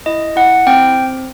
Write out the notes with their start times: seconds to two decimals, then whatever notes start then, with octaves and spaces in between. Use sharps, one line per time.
0.06 E4 D#5
0.36 E4 F#5
0.67 C4 G5